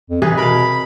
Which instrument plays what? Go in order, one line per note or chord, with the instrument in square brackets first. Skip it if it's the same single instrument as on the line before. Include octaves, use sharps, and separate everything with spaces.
[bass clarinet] F2
[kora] C3 G#4 B4 [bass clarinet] E3
[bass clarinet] B2 [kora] A#4 F5 [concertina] B5